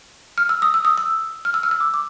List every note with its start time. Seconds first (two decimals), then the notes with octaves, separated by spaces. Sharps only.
0.38 F6
0.49 E6
0.62 D#6
0.74 E6
0.85 D#6
0.98 E6
1.45 F6
1.54 E6
1.63 F6
1.71 E6
1.80 D6
1.94 D6